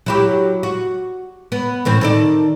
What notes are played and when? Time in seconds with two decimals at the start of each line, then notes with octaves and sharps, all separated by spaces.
0.06 F#3 E4 G4
0.63 F#4
1.52 B3
1.85 A2 E3 C4
2.01 D#3 A4 D5